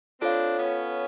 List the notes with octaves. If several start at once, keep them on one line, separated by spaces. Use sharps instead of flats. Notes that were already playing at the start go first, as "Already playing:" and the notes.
C4 D4 F4 A4 C#5 F5
B3 C#4